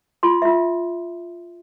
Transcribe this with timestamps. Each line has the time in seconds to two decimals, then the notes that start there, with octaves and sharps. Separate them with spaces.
0.23 F4 C6
0.42 F4 E5